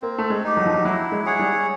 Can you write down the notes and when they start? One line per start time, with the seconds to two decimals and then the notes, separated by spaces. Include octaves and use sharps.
0.02 A#3 C4
0.18 A3
0.30 G#3
0.44 D#4 G4
0.57 F#3
0.66 F3
0.74 F#3
0.84 F#3 E4
1.12 G#3
1.26 G#4 C#5 F#5
1.39 G3